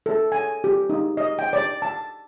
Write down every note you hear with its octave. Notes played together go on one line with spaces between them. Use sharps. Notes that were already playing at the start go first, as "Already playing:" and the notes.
A4
G#5
G4
D#4
D#5
G5
D5
A5